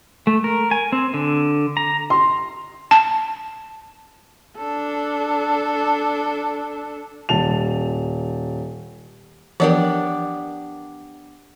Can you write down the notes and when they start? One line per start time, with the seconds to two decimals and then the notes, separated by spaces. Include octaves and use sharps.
0.27 A3
0.44 A#4
0.71 G#5
0.92 C4
1.14 D3
1.77 A#5
2.10 C6
2.91 A5
4.58 D4 A4
7.29 D#1 A5 F7
9.60 E3 F3 B3 D4 G4 A#4